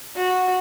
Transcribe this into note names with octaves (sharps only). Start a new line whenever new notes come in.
F#4